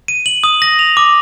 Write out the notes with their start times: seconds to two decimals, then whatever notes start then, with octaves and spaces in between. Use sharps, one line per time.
0.08 D#7
0.26 F#7
0.44 D#6
0.62 A#6
0.79 F7
0.97 D6